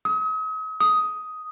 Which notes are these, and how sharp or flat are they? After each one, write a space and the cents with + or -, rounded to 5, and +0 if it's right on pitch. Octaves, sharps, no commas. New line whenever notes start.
D#6 +40
D#6 +10